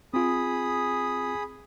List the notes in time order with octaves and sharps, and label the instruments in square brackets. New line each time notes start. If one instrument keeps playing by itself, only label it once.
[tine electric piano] C4 F4 [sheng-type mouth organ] G#4 B5 D#6